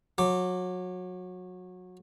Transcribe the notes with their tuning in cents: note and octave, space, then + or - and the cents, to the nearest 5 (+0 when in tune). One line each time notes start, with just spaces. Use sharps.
F#3 -25 D6 +0